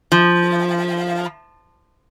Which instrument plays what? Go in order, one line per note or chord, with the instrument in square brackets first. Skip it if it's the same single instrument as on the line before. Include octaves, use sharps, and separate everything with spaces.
[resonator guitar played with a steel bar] F3